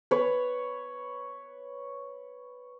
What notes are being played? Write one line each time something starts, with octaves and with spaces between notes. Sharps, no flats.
B4 C#5